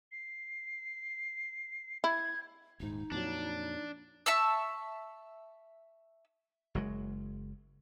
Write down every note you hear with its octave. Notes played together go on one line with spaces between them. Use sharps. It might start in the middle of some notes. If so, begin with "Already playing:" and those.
C7
E4 G#6
D#1 G#2 D#4
F2 A#2 F#3 D4
E5 A5 C#6 E6
F#1 F#3 G#3